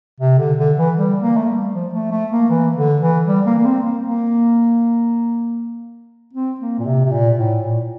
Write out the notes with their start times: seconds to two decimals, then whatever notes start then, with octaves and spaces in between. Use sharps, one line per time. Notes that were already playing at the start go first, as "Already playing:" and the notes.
0.20 C3
0.38 D3
0.58 D3
0.78 E3
0.96 G3
1.22 A#3
1.37 A3
1.48 G3
1.74 F3
1.93 A3
2.11 A3
2.32 A#3
2.50 E3
2.76 D3
3.01 E3
3.27 G3
3.46 A#3
3.58 A#3
3.65 C4
3.84 A#3
4.04 A#3
6.33 C4
6.60 A#3
6.79 A#2
6.86 C3
7.05 C3
7.11 A#2
7.36 A2
7.62 A#2